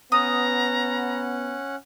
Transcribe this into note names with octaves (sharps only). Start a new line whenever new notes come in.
B3 C#4 F#5 A#5 D#6